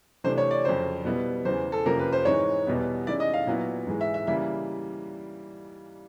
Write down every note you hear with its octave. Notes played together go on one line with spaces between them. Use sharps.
C3 E3 A3 D4 C5
C#5
D5
F2 C#3 F#3 C5
B2 G3 B3 E4
E2 C#3 E3 C5
A4
F2 C3 F3 A#3 C#4 A#4
B4
C5
G#2 E3 G#3 C4 D#4 C#5
E2 B2 G3 B3 E4
D#3 G#3 C#4 E4 D5
D#5
F5
A#2 F#3 B3 E4
G#2 E3 G#3
E5
E5
C#3 E3 G3 A#3 E5